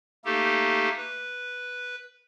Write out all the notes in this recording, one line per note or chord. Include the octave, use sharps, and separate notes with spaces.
A3 A#3 D#4 G4 A4
B4